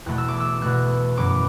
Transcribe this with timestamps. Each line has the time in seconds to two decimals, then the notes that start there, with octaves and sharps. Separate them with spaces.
0.06 E2 B2 A3 F#6
0.18 E6
0.29 D6
0.40 E6
0.62 B2 A3 F#6
1.17 F#2 E3 B3 D6